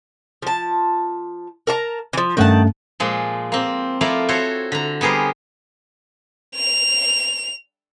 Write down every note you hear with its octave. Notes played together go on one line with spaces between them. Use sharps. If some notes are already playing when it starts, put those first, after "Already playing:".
F3 A5
A#4 A5 A#5
E3 F3
G2 D#3 A3 C#4 F#5 A5
A#2 F3 G#3
A#3 C4
F3 A3 E4 A#4 D5 F5
F#4 A4 C5 C#5
D3 A#5
G3 B3 G#4 A#4 C5
F7